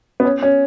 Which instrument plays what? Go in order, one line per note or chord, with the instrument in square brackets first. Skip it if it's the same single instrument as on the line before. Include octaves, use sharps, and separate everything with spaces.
[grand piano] B3
C#4
C#4